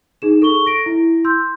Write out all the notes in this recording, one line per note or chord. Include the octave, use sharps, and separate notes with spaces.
D#4 G#4 E7
A4 C#6 G7
A#6 D7
E4
C6 E6 G6